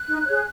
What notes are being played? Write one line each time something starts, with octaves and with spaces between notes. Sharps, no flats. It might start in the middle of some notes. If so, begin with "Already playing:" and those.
Already playing: F#6
D#4
G#4 C#5